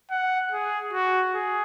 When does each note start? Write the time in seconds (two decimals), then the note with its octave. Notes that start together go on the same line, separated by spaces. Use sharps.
0.11 F#5
0.52 G#4
0.93 F#4
1.34 G#4